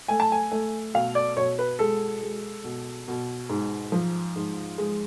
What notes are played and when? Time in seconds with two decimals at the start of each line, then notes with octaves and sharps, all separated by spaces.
0.08 A3 G#5
0.20 A5
0.32 G#5
0.52 A3
0.94 B2 F5
1.15 D5
1.37 B2 C#5
1.59 B4
1.79 G#3 A4
2.22 G#3
2.64 B2
3.08 B2
3.49 G#2
3.92 F3
4.36 G#2
4.78 G#3